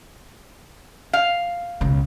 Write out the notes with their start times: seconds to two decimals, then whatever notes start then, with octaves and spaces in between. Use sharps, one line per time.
1.13 F5
1.81 C#2 B2